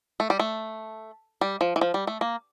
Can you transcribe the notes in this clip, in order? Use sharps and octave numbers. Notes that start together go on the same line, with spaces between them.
A3
G3
A3
G3
F3
E3
F3
G3
A3
A#3